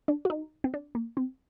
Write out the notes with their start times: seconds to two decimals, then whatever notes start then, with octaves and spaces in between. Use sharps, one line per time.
0.08 D4
0.25 F#4
0.30 D#4
0.64 C4
0.74 D4
0.95 A#3
1.17 C4